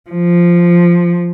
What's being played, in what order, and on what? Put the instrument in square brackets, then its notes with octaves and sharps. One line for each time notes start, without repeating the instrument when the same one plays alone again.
[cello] F3